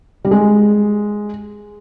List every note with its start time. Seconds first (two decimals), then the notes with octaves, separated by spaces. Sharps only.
0.25 G3
0.31 G#3